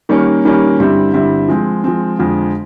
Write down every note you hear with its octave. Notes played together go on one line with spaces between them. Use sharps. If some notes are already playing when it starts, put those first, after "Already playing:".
D#3 G3 A#3 C#4
D#3 G3 A#3 C#4
G2 D3 G3 C4 E4
G2 D3 G3 C4 E4
F3 G#3 C4
F3 G#3 C4
F2 D3 F3 G#3